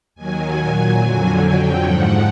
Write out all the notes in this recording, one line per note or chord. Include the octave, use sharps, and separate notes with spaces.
D#2 D#3 F#3 G#5
A#2 F#3 G#5
F2 D3 F#3 G#5
F2 D3 F#3 G5
G#2 F3 F#5